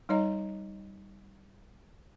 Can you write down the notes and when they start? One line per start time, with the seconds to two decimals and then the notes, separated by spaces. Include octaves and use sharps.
0.09 G3 D#4 C#5 D#5 A#5